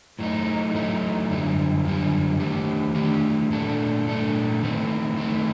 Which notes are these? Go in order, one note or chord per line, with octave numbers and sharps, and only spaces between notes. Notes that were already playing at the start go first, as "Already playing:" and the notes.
A2 F#3 A3 D#4
A2 F#3 A3 D#4
F#2 D3 G3
F#2 D3 G3
D#3 A3 D4 G4
D#3 A3 D4 G4
A#2 A3 D4 A4
A#2 A3 D4 A4
D#3 A3 C4
D#3 A3 C4